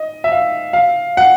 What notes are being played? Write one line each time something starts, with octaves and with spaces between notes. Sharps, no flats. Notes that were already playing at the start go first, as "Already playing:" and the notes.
Already playing: D#5
E5
F5
F5
F#5